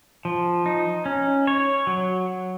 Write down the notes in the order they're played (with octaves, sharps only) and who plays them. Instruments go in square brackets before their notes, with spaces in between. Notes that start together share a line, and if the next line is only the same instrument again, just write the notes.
[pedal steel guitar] F3
D#4
C#4
C#5
F#3